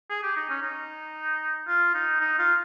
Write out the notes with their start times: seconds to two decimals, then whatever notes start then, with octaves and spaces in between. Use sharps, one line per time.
0.10 G#4
0.23 G4
0.36 D#4
0.50 C#4
0.62 D#4
1.68 F4
1.94 D#4
2.21 D#4
2.39 F4